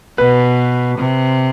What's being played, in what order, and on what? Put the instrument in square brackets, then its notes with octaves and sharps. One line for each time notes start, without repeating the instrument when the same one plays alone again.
[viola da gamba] B2 [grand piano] B4
[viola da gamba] C3